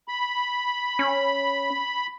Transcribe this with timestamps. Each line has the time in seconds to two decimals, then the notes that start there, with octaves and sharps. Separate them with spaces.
0.08 B5
0.99 C#4